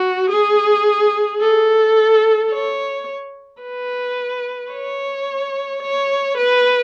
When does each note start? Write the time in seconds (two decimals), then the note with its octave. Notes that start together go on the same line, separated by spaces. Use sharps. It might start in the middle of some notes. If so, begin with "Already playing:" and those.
Already playing: F#4
0.30 G#4
1.40 A4
2.51 C#5
3.62 B4
4.72 C#5
5.82 C#5
6.38 B4